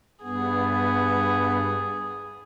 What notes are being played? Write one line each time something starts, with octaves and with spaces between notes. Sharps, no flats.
G2 B3 G#4